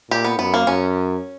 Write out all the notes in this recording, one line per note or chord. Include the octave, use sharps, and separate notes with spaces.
A#2 G4
B3
F#2 B3
A#3
F#2 C#4